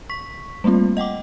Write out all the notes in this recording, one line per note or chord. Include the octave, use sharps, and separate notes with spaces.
C#6 B6
G3 A3 A#3 C4 F4
D#5 F#5 G5 D6